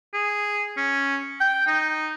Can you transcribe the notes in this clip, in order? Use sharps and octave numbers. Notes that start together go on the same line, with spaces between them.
G#4
C#4
G5
D#4